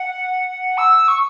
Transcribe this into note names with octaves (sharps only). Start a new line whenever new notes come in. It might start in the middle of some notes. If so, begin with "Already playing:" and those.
Already playing: F#5
E6
C#6